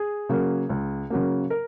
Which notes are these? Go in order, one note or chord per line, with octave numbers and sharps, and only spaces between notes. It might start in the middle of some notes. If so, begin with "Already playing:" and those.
Already playing: G#4
C#3 F#3 A#3
C#2
C#3 F#3 A#3
A#4